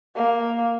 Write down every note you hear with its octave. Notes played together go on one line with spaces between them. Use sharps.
A#3